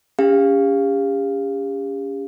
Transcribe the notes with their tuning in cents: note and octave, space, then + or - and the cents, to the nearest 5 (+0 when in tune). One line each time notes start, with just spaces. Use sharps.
C#4 +20 G4 +45 F5 +0